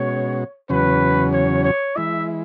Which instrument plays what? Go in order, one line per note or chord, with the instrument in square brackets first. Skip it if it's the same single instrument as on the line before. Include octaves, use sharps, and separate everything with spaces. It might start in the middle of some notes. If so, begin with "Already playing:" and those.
Already playing: [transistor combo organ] B2 G#3 C#4 F#4 [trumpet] C#5
[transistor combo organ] E2 C#3 F#3 C#4 [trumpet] B4
[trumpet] C#5
C#5
[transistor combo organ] E3 G#3 E4 [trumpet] E5